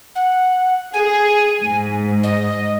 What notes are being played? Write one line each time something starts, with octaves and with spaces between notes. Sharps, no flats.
F#5
G#4 G#5
G#2
D#5